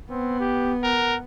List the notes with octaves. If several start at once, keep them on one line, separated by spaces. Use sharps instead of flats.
B3 C4
G4
A#4 F#5